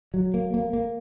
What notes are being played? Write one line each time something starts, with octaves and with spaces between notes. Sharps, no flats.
F#3
A#3
A#3
A#3